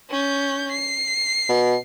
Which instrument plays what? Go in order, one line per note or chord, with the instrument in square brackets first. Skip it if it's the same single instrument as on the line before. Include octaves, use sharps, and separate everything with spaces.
[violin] C#4 G6
C7
[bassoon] B2